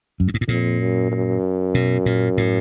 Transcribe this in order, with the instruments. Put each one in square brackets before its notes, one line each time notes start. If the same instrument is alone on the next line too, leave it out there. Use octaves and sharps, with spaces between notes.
[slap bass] F#2
G2
G#2
A2
[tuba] F2 [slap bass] A#2
[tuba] F#2
F#2
[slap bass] B2
A#2
A2